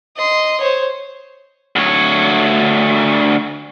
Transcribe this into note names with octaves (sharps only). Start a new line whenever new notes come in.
D#5 C6
C5 C#5
D2 C#5